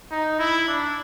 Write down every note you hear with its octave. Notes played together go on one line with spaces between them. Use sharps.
D#4
E4
D4